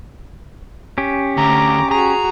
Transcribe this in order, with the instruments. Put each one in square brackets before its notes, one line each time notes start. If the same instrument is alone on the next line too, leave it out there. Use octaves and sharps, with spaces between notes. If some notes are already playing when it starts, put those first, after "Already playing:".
[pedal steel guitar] C#4 G4
[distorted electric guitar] D2 [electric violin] A#5 D6
[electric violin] F#4 G#4 [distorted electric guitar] A#5